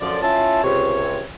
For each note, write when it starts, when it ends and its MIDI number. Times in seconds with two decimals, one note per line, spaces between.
0.01 0.18 42
0.01 0.18 50
0.01 0.18 53
0.01 0.18 74
0.22 0.61 61
0.22 0.61 64
0.22 0.61 65
0.22 0.61 76
0.22 0.61 81
0.63 1.22 37
0.63 1.22 48
0.63 1.22 73